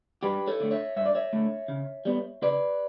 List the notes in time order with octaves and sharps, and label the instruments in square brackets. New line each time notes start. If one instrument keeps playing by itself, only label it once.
[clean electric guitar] G2 G4 B4
A4 C#5
D3 A3
C#5 E5
G2 E5
D5
C#5 E5
D3 A3
C#3
G3 B3
C#3 B4 D5